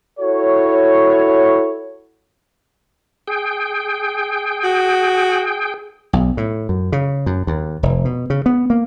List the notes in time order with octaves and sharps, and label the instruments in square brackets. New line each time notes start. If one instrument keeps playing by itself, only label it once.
[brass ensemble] E4 F#4 A4 C#5
[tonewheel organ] G#4 G5
[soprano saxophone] F#4
[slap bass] B1
A2
F#2
C#3
F#2
D#2
F1
B2
C#3
B3
A#3